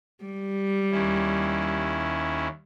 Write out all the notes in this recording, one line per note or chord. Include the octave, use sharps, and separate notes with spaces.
G3
D#2 C#4 E4